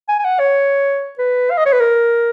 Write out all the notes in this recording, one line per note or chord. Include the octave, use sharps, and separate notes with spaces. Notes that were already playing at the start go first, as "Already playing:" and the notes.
G#5
G#5
F#5
C#5
B4
F5
D#5
C#5
B4
A#4